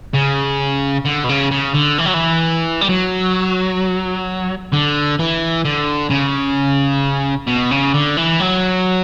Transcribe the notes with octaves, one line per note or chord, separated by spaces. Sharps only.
C#3
D3
B2
C#3
C#3
D3
E3
F#3
E3
G3
F#3
D3
E3
D3
C#3
B2
C#3
D3
E3
F#3